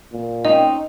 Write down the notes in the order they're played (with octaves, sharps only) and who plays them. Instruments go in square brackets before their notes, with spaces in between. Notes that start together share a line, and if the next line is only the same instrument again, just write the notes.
[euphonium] A#2
[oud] C4 C#4 [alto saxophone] D#4 [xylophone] D#5